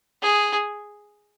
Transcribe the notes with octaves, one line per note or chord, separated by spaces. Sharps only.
G#4